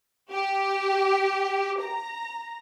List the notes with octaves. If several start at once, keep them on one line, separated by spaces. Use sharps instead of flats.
G4
A#5